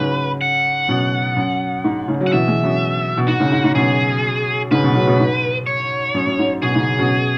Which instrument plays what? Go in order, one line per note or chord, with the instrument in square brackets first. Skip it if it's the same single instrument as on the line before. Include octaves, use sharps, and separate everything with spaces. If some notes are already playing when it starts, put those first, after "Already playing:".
Already playing: [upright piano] G#2 C#3 F#3 [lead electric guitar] B4
[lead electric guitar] F#5
[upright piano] F#2 B2
F#2
G#2
G#2 C#3
F#3
[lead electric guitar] F#5
[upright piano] B2 E3 [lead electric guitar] E5
[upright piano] E3 G#3
F#2 B2
B2
[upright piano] G#2 [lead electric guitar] F#4
[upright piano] G#2 C#3
G#2
G#2
[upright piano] F#2 B2 [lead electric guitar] G#4
[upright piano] G#2 C#3 [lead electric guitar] B4
[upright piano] F#2 B2
C#3 F#3
F#2 B2
G#2
[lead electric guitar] C#5
[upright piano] F#2
F#2
G#2
[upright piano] F#2 B2 [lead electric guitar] G#4
[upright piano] G#2 C#3
F#2 B2